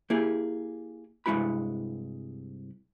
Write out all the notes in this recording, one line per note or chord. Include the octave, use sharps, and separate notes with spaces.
A#3 E4 G4 G#4
C2 G2 G#3 E4 F#4 B5